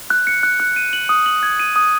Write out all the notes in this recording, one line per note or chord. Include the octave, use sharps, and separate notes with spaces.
F#6
C#7
F#6
F#6
D#7
F#7
D#6
F#7
G#6
D#7
D#6